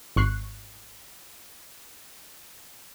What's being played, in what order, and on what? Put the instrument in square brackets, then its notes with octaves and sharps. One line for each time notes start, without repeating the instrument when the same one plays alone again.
[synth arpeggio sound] G#1 C#6 F#6 C7